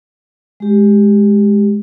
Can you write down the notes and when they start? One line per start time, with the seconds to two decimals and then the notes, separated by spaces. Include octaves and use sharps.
0.60 G#3 G4